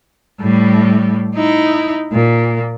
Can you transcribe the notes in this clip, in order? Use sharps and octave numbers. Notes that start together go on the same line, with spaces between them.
A2 G3
D#4 E4
A#2